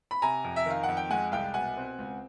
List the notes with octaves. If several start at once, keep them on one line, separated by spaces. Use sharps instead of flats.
B5
C3 G#5 A#5
F2
E5
D#3 F5
F#5
F2
G5
G#3 F#5 G#5
C2 F5 G5
B2 F#5 G#5
C4
C#2